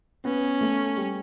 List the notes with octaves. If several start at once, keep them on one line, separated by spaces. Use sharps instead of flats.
B3 C#4
A3
G3